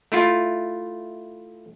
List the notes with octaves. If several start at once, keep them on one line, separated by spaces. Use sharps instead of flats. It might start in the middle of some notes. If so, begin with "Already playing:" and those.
A3 E4 F4